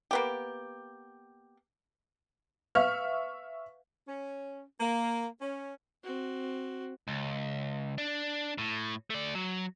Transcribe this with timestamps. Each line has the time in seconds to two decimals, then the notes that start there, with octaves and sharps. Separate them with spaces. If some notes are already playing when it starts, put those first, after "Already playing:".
0.11 A#3 B3 G4
2.75 B4 E5 F5 C#6 F6
4.07 C#4
4.80 A#3
5.41 C#4
6.03 C4 F#4
7.08 C#2
7.98 D4
8.58 A2
9.10 A3 D5
9.35 F#3